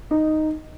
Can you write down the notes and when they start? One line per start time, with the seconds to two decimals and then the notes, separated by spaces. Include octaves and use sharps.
0.11 D#4